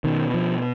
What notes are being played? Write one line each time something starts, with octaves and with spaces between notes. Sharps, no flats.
B2 D#3
F3